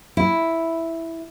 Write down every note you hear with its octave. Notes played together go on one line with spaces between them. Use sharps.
E4